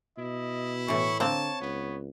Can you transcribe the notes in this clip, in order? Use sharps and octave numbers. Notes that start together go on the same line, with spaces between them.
B2 E4 D#5
A2 E3 C#6
D3 A#3 C4 C#5 A5
C#2 B3